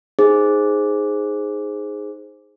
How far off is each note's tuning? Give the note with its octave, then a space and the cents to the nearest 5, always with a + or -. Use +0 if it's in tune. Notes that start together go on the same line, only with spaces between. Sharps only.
D#4 +0 G#4 +0 C5 +0